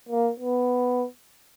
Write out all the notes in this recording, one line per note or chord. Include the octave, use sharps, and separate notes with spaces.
A#3
B3